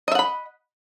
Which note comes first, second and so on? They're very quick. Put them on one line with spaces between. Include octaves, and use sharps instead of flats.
D#5 E5 F#5 B5